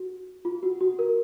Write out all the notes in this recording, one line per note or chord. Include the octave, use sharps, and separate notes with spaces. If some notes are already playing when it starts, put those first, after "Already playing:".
Already playing: F#4
F4
F#4
F#4
A#4